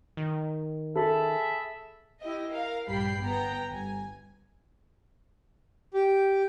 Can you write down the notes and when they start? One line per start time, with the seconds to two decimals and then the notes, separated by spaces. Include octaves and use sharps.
0.17 D#3
0.96 G#4 A4 E5 A5 B5
2.22 E4 G4 D#5
2.52 A#4 F5
2.88 A#1 G2 G3 G5 B5 C7
3.21 G1 B3 G5 A#5
3.69 G1 G#5
5.94 G4